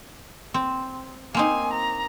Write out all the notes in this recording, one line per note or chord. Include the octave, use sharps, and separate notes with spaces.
C4
A#3 C4 D#4 G#5
A#5